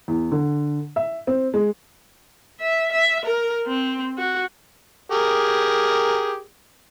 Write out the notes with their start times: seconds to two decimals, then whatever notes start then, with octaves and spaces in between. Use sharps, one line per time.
0.08 E2
0.32 D3
0.96 E5
1.27 C4
1.54 G#3
2.61 E5
2.92 E5
3.25 A#4
3.67 C4
4.18 F#4
5.11 G4 G#4 A#4